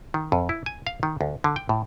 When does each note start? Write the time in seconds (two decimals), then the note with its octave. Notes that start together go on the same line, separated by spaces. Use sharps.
0.14 D#3
0.32 F2
0.49 E4
0.66 G#5
0.87 F5
1.03 D#3
1.21 D2
1.44 D3
1.56 G5
1.69 A2